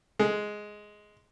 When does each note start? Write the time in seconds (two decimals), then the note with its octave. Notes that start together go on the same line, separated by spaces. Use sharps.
0.19 G#3